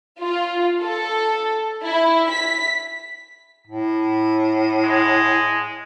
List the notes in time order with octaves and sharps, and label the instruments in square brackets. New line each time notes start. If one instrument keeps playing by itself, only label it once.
[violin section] F4
A4
E4
B6
[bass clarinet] A2
[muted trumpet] G#3